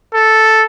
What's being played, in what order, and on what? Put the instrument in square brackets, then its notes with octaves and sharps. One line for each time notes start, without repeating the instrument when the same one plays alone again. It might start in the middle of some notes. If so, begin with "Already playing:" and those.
[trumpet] A4